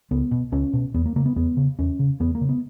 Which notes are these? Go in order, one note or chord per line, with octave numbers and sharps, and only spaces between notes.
C#2 B3
B2
C#2 C#4
B2
E2 B3
A#3
C#3 A#3
B3
E2 B3
C#3
E2 C#4
C#3
E2 B3
A#3
C#3
B3